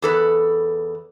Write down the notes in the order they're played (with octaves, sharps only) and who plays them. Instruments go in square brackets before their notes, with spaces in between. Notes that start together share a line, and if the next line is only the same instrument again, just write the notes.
[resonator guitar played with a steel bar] E2 A4 B4